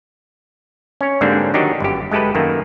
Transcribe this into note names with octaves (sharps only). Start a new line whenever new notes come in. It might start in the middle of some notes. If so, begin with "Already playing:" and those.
C#4 C#5
G#2 D3 G3 A#3 C4 D4
D#3 F#3 D4 D#4 F#4 G4
G1 F#2 G4
G#3 A3 G4 A4 B4
F#2 D#3 A3 A#3